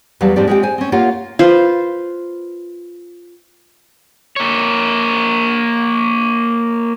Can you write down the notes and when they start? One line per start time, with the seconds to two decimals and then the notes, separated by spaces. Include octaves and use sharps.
0.21 E2 F#3 G3 D5 F5 A5
0.36 G#2 F3 C4 D#4 G4 D5
0.47 G#3 C4 F4 G4 G5
0.63 C5 G#5
0.78 C4 C#4
0.92 A#3 F4 G4 C#5 F5 F#5
1.39 F4 B4 C5
4.36 A#3 C#5